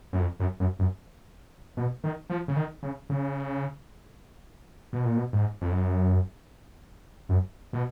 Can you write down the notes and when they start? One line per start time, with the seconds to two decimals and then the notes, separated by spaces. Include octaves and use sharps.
0.13 F#2
0.20 F2
0.40 F#2
0.60 F#2
0.79 F#2
1.77 B2
2.04 D#3
2.30 F3
2.48 C#3
2.56 D#3
2.83 C#3
3.10 C#3
4.93 B2
5.05 A#2
5.17 B2
5.33 G#2
5.62 F2
5.71 F#2
7.29 F#2
7.73 B2